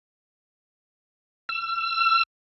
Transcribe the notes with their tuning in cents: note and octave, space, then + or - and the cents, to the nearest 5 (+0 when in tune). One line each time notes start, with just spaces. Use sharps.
E6 +35